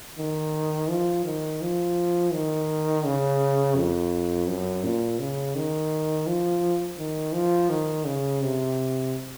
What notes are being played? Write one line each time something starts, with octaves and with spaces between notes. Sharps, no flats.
D#3
F3
D#3
F3
D#3
C#3
F2
F#2
A#2
C#3
D#3
F3
D#3
F3
D#3
C#3
C3